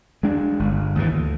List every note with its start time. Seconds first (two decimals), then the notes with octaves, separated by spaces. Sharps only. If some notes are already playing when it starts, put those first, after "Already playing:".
0.23 G#3 D4
0.59 G1
0.95 D#2 G#2 E3
1.13 D2